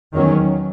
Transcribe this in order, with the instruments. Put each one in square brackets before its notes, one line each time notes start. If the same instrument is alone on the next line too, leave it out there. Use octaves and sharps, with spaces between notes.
[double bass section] E2 D#3 F#3 C#4